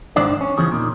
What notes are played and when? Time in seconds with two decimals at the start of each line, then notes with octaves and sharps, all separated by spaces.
0.16 G#2 D#3 D4 C5 D5
0.41 C#4
0.58 E2 C#3 E3 F3 G#4
0.71 A#2 D#3